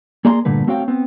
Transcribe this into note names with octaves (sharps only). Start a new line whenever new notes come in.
A#3 G#4 D5 G#5 A#5 C6
G2 A#2 D3 A3 B4
A3 C4 F#4 C#5 F5 G5
B3 C4